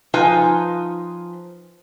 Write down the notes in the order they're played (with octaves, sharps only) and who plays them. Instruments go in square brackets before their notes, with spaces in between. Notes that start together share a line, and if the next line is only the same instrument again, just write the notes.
[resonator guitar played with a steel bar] F3 D#4 F4 B4 G#5